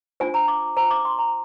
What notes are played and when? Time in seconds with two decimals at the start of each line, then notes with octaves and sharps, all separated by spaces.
0.20 D4 F4 C5 G#5
0.34 A#5
0.48 D6
0.77 F4 C5 A#5
0.91 D6
1.05 C6
1.19 A#5